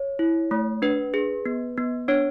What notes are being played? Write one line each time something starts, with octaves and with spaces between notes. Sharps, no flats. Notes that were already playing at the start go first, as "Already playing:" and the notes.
Already playing: C#5
E4
A3
D4 B4
G#4
B3
B3
D4 C#5